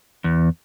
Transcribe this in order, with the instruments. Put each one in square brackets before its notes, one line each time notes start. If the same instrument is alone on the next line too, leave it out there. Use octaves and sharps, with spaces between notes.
[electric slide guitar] E2